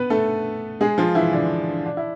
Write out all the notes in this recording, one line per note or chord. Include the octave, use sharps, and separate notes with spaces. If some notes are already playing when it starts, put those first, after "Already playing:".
Already playing: B3 B4
A3 A4
G#3 G#4
F3 F4
E3 E4
D3 D4
D4
E4